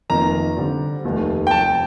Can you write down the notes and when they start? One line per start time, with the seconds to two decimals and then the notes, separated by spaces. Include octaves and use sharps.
0.09 F1 F2 D#3 A#3 F4 A#5
0.57 D3 G3 C4 G4 D5
1.04 F1 D#2 D#3 A3
1.47 G5
1.51 F1 F2 C3 A5